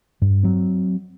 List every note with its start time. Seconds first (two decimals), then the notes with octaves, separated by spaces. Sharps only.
0.22 G2
0.43 F#3 C4